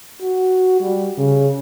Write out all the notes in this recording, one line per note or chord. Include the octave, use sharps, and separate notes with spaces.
F#4
G3
C#3